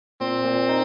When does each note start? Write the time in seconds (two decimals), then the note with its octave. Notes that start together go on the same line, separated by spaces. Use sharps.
0.21 A#2 C4
0.45 A#2
0.69 D#4